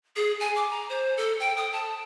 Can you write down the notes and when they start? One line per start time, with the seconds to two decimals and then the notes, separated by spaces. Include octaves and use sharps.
0.16 G#4
0.40 G#5
0.56 D6
0.70 A#5
0.89 C5
1.17 A4
1.40 G5
1.57 D#6
1.73 A5